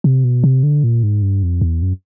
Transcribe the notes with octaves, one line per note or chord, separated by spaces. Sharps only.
C3
B2
C3
D3
A#2
G#2
G2
F2
E2
F#2